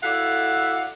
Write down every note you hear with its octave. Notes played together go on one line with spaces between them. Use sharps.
E4 F#4 A4 D5 F5 F#5